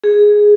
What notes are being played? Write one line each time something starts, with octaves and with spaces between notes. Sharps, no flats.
G#4